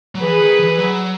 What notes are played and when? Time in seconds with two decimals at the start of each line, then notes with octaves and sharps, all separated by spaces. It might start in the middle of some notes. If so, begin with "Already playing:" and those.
0.15 F#3
0.22 E3 G#4 B4
0.40 D#3
0.59 E3
0.78 F#3